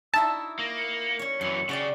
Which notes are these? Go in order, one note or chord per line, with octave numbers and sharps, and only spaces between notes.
D#4 E4 F#4 A5 E6
A#3 A#6
C#7
C#4 C#5
F#2 E3 C6
C#3 F#4 D5 G5